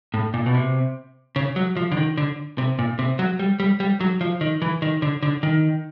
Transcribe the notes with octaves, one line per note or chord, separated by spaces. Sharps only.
A2
A#2
B2
C3
C#3
F#3
F3
D3
D#3
D3
C3
A#2
C3
F#3
G3
G3
G3
F#3
F3
D#3
E3
D#3
D3
D3
D#3